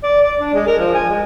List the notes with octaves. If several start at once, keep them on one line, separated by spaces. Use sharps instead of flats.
D5
D5
D4
G#3
A#4
F3
G#5
G#3